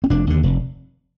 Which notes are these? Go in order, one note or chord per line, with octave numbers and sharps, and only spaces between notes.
C4
F1 D4
D#2 D3
F1